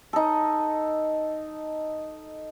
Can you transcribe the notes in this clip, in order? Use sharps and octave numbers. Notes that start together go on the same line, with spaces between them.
D#4 A4